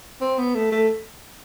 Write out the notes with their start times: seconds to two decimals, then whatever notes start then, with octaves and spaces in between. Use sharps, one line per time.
0.21 C4
0.38 B3
0.55 A3
0.72 A3